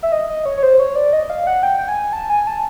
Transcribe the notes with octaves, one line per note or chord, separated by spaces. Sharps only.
E5
D#5
D#5
C#5
C#5
C5
C#5
D5
D#5
F5
F#5
G5
G5
G#5
A5
G#5
A5